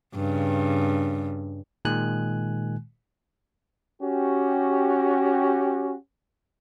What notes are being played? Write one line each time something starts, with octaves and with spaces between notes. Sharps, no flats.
G2 C#3
A#2 D#3 G#3 G#5 F#6
C#4 F#4 G4